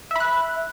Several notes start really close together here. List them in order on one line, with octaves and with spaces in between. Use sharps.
E5 B5 F#6